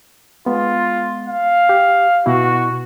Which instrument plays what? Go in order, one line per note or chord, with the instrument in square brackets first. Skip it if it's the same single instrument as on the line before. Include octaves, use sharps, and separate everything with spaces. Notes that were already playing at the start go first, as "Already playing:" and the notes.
[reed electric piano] G#3 B3 [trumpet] F4
[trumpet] F5
[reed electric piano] G4
[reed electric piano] B2 E4 [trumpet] F#4